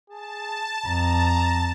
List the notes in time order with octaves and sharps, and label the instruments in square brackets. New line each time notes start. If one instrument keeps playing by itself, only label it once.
[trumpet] G#4 [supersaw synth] A5
[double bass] F2 [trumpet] A#5